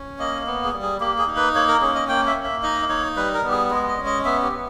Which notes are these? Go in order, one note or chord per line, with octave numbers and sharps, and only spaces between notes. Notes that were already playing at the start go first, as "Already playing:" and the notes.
Already playing: C#4
A#3 D#5
B3
G#4
G3
G#4
A#3 G4
G#4
D#4
B4
A#3 C#5
A#4
C#4 G#4
D#5
A#3 G5
E5
A#3
E5
D#4 D#5
D#4 C#5
G3 B4
A#4
B3 G4
G#4
G#3 G#4
D#5
C#4
D#5
B3 E5
G4
B3